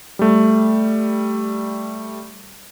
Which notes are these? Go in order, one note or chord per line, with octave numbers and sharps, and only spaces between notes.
G3 A3